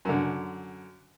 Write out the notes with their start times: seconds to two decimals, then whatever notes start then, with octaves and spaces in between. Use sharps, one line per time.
0.05 F#2 D3